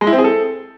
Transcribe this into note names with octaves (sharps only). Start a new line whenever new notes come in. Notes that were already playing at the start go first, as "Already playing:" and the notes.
G#3
E4
C4
G#4
A4